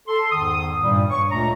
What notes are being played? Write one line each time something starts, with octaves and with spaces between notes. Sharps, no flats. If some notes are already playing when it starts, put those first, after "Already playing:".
A4 C6
E2 G#2 D#3 D#6
G2 A#2 G3
C#5 C#6
C#2 A#2 A3 D4 A#5